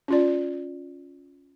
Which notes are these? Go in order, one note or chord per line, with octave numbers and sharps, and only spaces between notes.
C#4 F4 D5